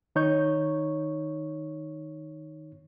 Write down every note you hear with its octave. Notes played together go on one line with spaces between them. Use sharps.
D#3 D#4 C#5 C#6 G6